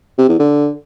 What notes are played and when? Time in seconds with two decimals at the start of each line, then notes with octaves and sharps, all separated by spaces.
0.18 C3
0.29 E2
0.39 D3